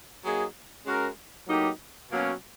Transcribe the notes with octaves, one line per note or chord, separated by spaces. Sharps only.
F#3 A#3 D#4 G#4
G#3 C#4 F#4 A#4
A2 F#3 A#3 D#4 G4
B2 F#3 A#3 C#4